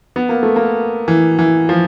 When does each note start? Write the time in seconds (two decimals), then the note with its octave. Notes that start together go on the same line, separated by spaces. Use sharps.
0.16 B3
0.29 A#3
0.43 A3
0.56 A#3
1.08 E3
1.39 E3
1.69 F3